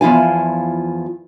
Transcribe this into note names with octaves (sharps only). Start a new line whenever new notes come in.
E2 F3 E4 F4 G#5